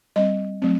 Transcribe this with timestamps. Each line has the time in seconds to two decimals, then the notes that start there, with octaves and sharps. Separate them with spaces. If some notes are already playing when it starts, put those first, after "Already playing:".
0.16 G3 C4 D#5
0.62 F#3 A3 C4